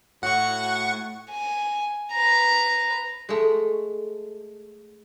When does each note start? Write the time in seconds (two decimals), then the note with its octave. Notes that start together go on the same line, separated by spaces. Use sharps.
0.23 A2 F#4 F#5 C#6
1.31 G#5
2.12 B4 A#5
3.29 G#3 A3